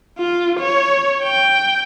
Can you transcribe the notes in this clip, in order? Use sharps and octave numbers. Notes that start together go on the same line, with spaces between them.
F4
C#5
G5